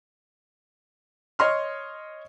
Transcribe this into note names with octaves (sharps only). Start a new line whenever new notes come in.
C#5 D#5 C6 F6